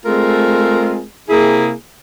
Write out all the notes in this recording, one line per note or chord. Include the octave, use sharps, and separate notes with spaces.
G#3 A3 C4 F4 G#4 A#4
C3 A#3 E4 G#4